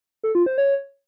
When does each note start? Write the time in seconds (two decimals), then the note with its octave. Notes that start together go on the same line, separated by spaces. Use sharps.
0.24 A4
0.35 F4
0.46 C5
0.58 C#5